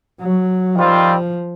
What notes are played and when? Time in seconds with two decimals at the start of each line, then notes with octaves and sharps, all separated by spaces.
0.21 F#3
0.75 D#3 F3 G3 C4 F4